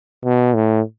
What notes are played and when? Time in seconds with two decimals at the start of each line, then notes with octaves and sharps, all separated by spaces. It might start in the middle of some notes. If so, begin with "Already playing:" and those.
0.25 B2
0.54 A2